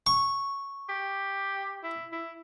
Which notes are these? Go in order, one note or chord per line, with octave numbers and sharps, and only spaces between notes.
C#6
G4
E4
E4